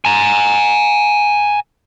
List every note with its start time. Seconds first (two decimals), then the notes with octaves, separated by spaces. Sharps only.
0.05 G#5 A#5